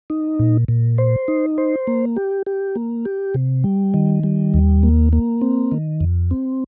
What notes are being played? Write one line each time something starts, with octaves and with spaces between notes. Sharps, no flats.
D#4
A#2
A#2
C5
D#4
C5
A#3
G4
G4
A#3
G4
C3
G3
D#3
G3
D#2
A#3
A#3
C4
D#3
F2
C4